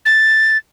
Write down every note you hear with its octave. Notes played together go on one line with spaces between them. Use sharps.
A6